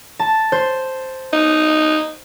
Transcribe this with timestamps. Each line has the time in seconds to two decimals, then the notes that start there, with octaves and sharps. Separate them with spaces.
0.19 A5
0.52 C5
1.33 D#4